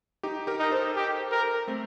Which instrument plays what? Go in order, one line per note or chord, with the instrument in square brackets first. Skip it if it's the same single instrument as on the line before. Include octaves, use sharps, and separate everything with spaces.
[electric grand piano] D#4 G4
G4 A#4
[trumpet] D#4
[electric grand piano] A4 C5
[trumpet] G4
A#4
[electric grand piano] A3 C4